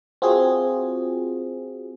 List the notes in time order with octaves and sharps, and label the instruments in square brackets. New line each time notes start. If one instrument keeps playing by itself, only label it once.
[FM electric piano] C4 F4 F#4 G#4